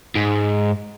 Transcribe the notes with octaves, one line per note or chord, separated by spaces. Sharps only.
G#2